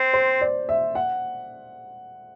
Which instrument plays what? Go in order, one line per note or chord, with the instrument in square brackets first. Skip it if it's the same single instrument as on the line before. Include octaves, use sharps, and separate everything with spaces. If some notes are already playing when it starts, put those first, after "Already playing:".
Already playing: [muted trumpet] C4 [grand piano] C5
[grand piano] C5
D5
E5
F#5